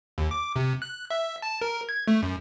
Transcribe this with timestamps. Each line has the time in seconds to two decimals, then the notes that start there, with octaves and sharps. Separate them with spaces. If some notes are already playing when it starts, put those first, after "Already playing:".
0.18 D#2
0.31 D6
0.56 C3
0.82 F#6
1.11 E5
1.42 A5
1.61 A#4
1.89 G#6
2.08 A3
2.22 F#2